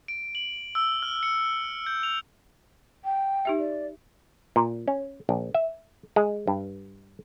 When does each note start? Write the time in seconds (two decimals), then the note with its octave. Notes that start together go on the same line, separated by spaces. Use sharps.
0.08 D7
0.35 F#7
0.75 E6
1.02 F6
1.23 C#7
1.86 G6
2.03 F7
3.04 G5
3.45 D#4 G4 E5
3.59 D5
4.56 A#2
4.88 C#4
5.29 A#1
5.54 E5
6.16 G#3
6.47 G2